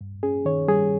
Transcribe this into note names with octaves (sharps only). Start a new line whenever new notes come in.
G2
C#4 G#4
D#3 C#5
G3 G#4